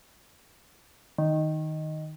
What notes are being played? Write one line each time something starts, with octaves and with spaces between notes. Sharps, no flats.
D#3